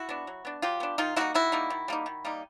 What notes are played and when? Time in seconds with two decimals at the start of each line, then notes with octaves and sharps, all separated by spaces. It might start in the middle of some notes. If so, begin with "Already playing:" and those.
Already playing: E4 F#4
0.09 B3 D4
0.27 F#3
0.45 B3 D4
0.62 F#3 F4 G4
0.80 B3 D4
0.98 D#3 D#4 F4
1.16 G3 A#3 D#4 E4 F#4
1.34 D#3 E4 F#4
1.52 G3 A#3 D#4
1.70 D#3
1.88 G3 A#3 D#4
2.06 D#3
2.25 G3 A#3 D#4